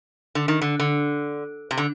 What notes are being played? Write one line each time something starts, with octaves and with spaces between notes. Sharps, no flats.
D3
D#3
D3
D3
C3
D3